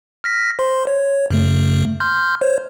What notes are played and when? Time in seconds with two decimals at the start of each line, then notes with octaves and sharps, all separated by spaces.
0.24 F6 A#6 B6
0.59 C5 C6
0.87 C#5
1.31 F#2 C#3 A3
2.00 C6 F6 G6
2.41 C5 C#5